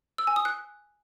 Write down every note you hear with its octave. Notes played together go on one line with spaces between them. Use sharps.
E6
G#5
D#6
F#6